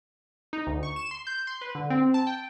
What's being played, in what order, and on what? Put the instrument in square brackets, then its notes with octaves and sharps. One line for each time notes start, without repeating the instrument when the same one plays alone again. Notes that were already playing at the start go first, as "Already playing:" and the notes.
[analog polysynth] D#4
D2
C#6
E7
C6
G6
C6
B4
D3
C4
A5
G5